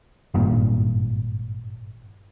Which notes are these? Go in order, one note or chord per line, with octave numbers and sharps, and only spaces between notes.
G#1 G2 A#2